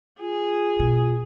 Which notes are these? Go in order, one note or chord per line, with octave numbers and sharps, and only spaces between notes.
F4 G#4
B2